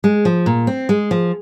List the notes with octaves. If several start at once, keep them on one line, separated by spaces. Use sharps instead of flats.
G#3
F3
A#2
C4
G#3
F3